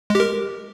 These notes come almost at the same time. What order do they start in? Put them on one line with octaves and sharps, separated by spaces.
G#3 G4 A#4